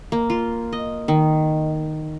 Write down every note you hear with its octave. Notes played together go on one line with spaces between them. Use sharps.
A#3
F4
D#5
D#3